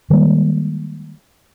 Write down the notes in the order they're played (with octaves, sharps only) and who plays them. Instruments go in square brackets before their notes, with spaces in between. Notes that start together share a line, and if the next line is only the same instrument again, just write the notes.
[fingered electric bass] D#3 G3 G#3 A#3